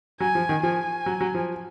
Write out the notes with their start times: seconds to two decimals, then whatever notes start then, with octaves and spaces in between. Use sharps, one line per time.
0.20 F#3 G#5
0.35 F3
0.49 D#3
0.63 F3 G#5
1.06 F#3
1.21 F#3
1.34 F3